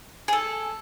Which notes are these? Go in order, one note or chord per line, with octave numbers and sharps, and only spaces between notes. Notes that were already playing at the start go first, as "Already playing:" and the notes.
G#4
A4